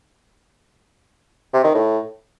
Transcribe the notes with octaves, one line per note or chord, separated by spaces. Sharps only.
C3
D#3
A2